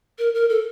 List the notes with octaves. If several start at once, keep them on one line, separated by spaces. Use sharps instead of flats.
A#4
A#4
A4